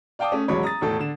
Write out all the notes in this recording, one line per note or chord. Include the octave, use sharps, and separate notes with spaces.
D5 F5 G5 A5 D6 D#6
A3 C#4
E1 A1 F#3 G#3 C#5 B5
A#5 D#6 A6
E1 A2 A4
D3 E7